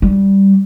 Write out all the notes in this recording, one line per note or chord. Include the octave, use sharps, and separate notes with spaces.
G3